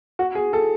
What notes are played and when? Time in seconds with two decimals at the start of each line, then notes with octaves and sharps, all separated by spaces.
0.19 F#4
0.35 G#4
0.53 A4